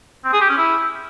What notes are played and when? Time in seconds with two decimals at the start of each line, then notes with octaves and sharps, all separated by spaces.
0.25 C4
0.33 G#4
0.41 G4
0.49 C#4
0.58 E4